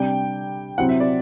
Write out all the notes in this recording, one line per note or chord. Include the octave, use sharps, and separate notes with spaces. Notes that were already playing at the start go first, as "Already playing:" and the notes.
Already playing: C3 G3 D4 G5
C3 F#3 C4 E4 F#5
E5
D5